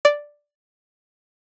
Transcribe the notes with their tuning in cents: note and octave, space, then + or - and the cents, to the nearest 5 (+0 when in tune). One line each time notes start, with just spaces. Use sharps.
D5 +0